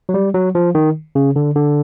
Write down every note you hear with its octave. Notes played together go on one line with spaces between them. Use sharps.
F#3
G3
F#3
F3
D#3
C#3
D3
D3